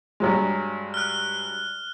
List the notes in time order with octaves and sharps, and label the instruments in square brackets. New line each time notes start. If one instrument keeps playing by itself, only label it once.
[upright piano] G2 F#3 G#3
[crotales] F6 F#6